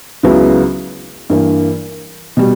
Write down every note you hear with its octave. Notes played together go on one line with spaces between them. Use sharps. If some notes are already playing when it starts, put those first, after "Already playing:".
C#2 C#3 F#3 B3 E4
G2 E3 A#3
B2 G3